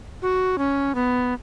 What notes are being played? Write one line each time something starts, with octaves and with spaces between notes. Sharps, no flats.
F#4
C#4
B3